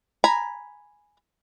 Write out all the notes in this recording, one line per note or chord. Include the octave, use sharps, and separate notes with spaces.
G#5 A#5 B5